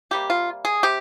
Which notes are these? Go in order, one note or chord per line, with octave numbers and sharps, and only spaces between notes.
C3 G3 A#3 G4
F4
G#4
C3 G4